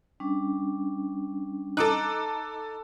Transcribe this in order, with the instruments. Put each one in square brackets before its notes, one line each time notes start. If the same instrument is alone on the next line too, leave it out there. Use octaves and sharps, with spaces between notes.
[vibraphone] G3 C#4 D4
[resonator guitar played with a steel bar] D#4 [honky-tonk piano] A4 D6 F#6